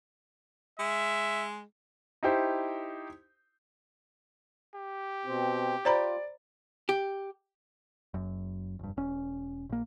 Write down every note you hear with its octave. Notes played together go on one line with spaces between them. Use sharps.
G#3 E5
D#4 E4 G4 C5
G4
B2 C4
F4 C5 D5 A#5 B5
G4
F#1 F#2
F1 G2
E1 C#4
A#1 A#3